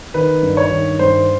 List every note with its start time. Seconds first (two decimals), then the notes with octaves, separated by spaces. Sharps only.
0.14 D#3 B4
0.43 G2
0.57 C#5
0.71 D#3
0.99 G2 C5